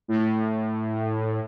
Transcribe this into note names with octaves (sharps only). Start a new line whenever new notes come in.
A2